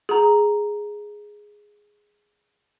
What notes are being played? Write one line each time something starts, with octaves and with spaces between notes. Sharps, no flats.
G#4 A#5